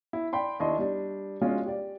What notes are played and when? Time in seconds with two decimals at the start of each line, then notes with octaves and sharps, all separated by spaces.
0.13 E4
0.33 D5 G5 B5 C6
0.60 D#2 D4 E4 D#5 C6
0.78 G3 D4
1.41 G#3 C#4 D4 F4 F#4
1.66 G4 D5